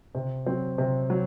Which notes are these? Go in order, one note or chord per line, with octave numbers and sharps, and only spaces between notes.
C3
F#3 C4
C3
F#3